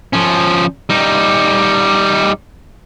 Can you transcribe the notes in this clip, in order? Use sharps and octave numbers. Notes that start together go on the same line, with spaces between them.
F3 C#4
G3 D#4